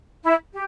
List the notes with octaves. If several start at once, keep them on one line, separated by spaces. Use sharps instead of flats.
E4
G4